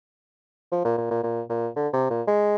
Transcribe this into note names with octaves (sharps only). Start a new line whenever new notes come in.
F3
A#2
A#2
A#2
A#2
A#2
D3
C3
A#2
G#3